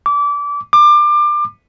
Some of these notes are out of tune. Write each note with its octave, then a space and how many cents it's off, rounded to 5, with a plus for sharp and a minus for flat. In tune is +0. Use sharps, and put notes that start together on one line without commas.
D6 -25
D6 +25